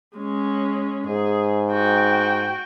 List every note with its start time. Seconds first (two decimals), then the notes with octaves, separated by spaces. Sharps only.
0.17 G#3 C#4
1.07 G#2 G#4
1.71 F#4 G5